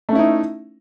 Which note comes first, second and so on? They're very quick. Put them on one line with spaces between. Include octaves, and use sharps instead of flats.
A3 C#4 E4 D#4